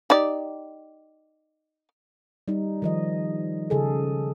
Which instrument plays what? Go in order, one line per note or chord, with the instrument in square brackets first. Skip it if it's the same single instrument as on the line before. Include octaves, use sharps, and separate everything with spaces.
[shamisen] D#4 G4 D5
[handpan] G3 D#4
D#3 F3 D#5
C#3 G#4 A4